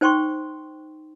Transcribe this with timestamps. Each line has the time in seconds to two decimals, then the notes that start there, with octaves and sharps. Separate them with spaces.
0.01 D#4 C5 G5 C6 C#6